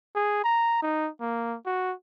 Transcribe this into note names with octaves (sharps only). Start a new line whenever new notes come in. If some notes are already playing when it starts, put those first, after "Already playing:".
G#4
A#5
D#4
A#3
F#4